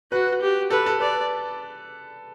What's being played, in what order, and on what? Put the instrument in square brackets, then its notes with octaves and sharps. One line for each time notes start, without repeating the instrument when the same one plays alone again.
[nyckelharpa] F#4 [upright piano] B4
[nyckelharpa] G4
[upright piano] A4 [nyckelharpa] B4
[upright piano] A4
[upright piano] B4 [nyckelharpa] D5